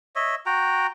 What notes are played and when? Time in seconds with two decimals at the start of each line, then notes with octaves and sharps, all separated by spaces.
0.16 C#5 D#5 E5
0.46 F#4 G5 A#5